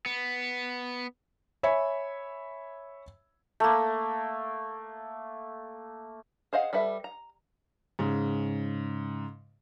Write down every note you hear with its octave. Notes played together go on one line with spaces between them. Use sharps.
B3
C#5 E5 G#5 B5
A3 A#3
G#4 C5 D#5 F5 F#5
G3 A4 B4 E5
A#5
G#2 C#3